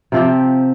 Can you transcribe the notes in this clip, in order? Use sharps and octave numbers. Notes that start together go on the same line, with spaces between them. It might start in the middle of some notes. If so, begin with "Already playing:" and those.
C3 F3 C4 G4